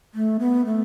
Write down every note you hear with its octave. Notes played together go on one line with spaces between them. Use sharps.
A3
B3
A3